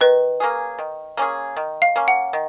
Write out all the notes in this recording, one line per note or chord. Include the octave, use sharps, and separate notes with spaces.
D#3 B4
A#3 C#4 G#4
D#3
A#3 C#4 G#4
D#3
F5
A#3 C#4
F#5
D#3